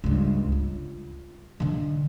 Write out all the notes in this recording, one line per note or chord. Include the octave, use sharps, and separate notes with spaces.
C#2 G2
F4
D3 D#3